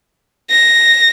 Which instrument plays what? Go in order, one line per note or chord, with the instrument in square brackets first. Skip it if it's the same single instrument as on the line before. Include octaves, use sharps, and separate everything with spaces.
[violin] A#6